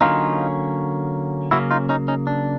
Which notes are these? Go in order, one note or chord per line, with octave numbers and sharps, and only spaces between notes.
D3 F#3 A#3 C#4 D#4 F4
C#3 F#3 A#3 C#4 E4 F#4
D#4 F4
C#4 D#4
C#4 D#4
D4